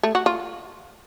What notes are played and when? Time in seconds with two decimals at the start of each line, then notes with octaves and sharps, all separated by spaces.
0.03 A3
0.15 F#4
0.26 F4